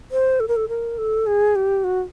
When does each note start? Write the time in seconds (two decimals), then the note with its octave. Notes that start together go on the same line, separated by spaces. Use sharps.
0.11 C5
0.40 A4
0.48 A#4
0.56 A4
0.69 A#4
0.98 A4
1.27 G#4
1.56 G4
1.84 F#4